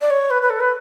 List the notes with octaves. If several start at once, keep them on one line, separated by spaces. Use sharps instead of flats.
D5
C#5
B4
B4
A4
B4